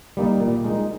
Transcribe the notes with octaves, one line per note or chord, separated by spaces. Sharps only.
G3 A#3 D#4
A#2
G#3 D#4